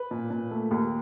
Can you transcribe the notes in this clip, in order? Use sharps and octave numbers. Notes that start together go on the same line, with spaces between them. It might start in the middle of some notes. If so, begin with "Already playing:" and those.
Already playing: B4
A#2
A#2
A3
D#2